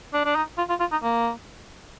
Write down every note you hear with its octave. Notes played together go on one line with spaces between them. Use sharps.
D4
D4
D#4
F4
F4
F4
D#4
A#3